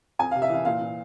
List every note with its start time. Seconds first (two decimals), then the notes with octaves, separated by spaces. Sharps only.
0.19 F2 G#5
0.31 C3 F5
0.42 E5
0.50 E3 F5
0.65 A#2 F5
0.81 A#2